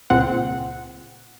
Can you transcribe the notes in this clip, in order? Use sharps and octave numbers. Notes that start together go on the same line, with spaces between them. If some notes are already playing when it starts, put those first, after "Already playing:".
C#2 A#2 C4 F#5